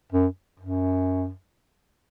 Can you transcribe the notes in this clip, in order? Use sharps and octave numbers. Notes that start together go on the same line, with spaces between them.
F#2
F#2